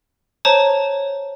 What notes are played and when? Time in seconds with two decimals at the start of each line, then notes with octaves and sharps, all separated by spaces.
0.45 C5 C#5 A5 A#5